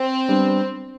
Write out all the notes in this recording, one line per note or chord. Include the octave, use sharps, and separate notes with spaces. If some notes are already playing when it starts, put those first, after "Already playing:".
Already playing: C4
G3 B3 D4